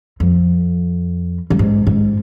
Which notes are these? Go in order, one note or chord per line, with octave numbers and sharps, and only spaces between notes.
F2
G2
G#2
G#2